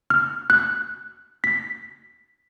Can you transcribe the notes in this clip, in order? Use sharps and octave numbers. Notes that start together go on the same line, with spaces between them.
F6
F#6
B6